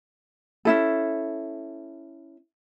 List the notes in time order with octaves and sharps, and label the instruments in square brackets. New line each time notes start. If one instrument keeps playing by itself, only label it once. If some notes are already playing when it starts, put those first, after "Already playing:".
[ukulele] C#4 E4 A4